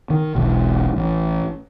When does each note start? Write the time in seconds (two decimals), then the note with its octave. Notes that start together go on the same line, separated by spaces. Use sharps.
0.10 D#3
0.35 E1 B1
0.96 A1